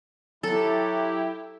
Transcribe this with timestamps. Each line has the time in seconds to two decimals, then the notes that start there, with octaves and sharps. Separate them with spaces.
0.43 F#3 E4 G4 A4